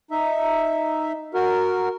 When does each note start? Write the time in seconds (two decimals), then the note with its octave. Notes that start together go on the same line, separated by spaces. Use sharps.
0.11 D#4 E5
1.34 F#4 A#4